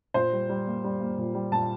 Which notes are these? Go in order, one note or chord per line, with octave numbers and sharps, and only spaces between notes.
A#2 C5
G3
G3
A#3
G3
A#3
A#2
G3
A#2 A5